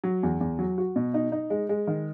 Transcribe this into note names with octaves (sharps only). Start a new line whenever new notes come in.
F#3
E2
E2
F#3
F#4
B2
D#4
D#4
G#3
G#3
D#3